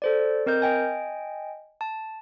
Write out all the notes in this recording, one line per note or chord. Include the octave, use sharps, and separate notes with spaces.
A4 C5 D5
C4 A#4 D#5 G6
D#5 G5 G#5
A5